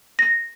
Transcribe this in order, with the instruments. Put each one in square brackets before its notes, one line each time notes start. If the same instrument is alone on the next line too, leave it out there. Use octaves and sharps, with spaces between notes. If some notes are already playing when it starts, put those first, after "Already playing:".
[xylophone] A#6